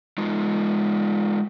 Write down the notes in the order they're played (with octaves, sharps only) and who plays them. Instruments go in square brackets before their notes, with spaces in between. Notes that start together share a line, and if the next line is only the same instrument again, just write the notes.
[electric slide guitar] G#3 D#4 F4